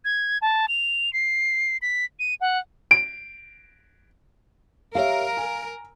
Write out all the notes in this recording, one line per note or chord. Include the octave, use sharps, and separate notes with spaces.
G#6
A5
F7
C7
B6
D#7
F#5
D7
G4 A#4 C#5 E5 F5
G#5